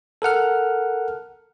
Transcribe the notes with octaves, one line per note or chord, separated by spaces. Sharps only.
A4 A#4 F#5 F6